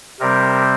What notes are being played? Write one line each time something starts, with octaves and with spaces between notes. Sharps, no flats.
C3 G3 C4 A#4